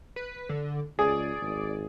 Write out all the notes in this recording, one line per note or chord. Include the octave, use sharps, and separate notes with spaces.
B4
D3
C#2 G#4 D5
G#1